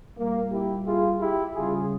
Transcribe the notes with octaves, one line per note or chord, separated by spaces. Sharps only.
A#2 G3 A#3
E4 G4
F4 G#4
E4 G4
C#3 G3 F4 G#4